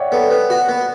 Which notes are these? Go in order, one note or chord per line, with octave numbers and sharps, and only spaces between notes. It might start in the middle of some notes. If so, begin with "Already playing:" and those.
Already playing: C#5 D5 E5 F#5 G5
B3 A4
B3 B4
F#4
B3